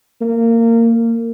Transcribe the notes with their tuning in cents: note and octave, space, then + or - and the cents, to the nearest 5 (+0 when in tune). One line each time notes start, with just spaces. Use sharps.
A#3 -20